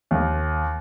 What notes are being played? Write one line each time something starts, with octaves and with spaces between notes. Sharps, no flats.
D#2